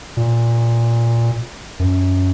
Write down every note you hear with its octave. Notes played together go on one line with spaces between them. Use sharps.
A#2
F#2